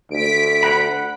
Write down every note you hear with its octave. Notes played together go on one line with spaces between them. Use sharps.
D2 B6 D7
F#5 B5